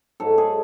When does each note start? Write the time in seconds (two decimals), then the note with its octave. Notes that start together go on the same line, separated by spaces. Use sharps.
0.20 G#2 F#3 A4
0.38 G#4